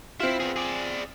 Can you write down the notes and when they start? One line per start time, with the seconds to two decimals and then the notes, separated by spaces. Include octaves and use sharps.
0.20 C4 E4 F4 E5
0.40 B3 G#4
0.56 G#4 D5